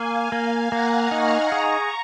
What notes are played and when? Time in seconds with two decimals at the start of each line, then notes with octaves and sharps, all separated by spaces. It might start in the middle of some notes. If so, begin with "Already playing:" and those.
Already playing: A#3 F5 G#5
0.32 A#3
0.72 A#3 F#5 A#5
1.11 D#4 C#6 F6
1.52 G#4 A#5 C#6